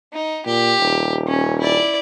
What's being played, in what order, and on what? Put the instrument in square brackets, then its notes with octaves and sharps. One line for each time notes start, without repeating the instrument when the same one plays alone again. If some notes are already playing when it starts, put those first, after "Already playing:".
[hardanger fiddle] D#4
[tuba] A#2 [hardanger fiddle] G4
[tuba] D#1
[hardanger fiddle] C#4
E4 D5